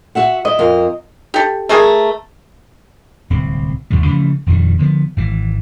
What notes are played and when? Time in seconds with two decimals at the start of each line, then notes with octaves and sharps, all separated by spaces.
0.15 F#4 E5 F#5
0.45 E4 D#5
0.59 F2 A#4
1.34 G4 A4
1.69 A3 G#4 A#4 G#5
3.30 D1 C2 C4
3.91 A1 D#2 C3 G3
4.06 C#3 E3 F3 A3
4.46 D#1 F2 D#3 G3
4.78 D3 F3 G3 B3
5.17 G#1 E3